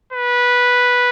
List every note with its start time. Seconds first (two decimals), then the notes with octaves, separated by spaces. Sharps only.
0.13 B4